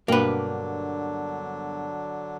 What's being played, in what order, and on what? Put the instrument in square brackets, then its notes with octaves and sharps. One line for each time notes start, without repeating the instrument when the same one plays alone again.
[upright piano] G2 B2 G5 [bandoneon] D3 F#3 D4 [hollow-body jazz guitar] A#3 B4